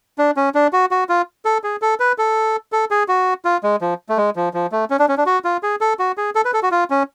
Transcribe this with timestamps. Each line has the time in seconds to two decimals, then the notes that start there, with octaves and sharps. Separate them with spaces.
0.18 D4
0.37 C#4
0.55 D4
0.73 F#4
0.91 F#4
1.09 F4
1.45 A4
1.64 G#4
1.82 A4
2.00 B4
2.18 A4
2.72 A4
2.91 G#4
3.08 F#4
3.45 F4
3.63 G#3
3.81 F3
4.09 A3
4.17 G#3
4.36 F3
4.54 F3
4.72 A3
4.90 C#4
4.99 D4
5.09 C#4
5.17 D4
5.26 F#4
5.45 F4
5.63 G#4
5.81 A4
5.99 F#4
6.18 G#4
6.35 A4
6.45 B4
6.54 A4
6.63 F#4
6.71 F4
6.90 C#4